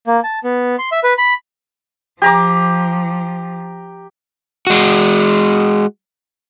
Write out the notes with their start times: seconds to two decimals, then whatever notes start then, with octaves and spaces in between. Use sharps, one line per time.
0.07 A#3
0.24 A5
0.44 B3
0.79 C6
0.92 E5
1.04 B4
1.18 B5
2.22 F3 G4 A#5 D6
4.67 G#3 F#4